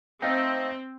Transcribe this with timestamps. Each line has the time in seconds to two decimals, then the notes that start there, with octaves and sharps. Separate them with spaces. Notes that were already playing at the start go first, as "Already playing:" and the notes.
0.22 A3 C4 D#4 D#5 F5 G5